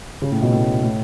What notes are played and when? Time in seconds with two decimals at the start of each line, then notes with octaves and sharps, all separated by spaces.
0.22 C#3
0.31 A2
0.42 B2
0.52 A2
0.83 A2